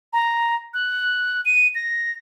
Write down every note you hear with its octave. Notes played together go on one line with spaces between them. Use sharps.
A#5
F#6
D#7
A#6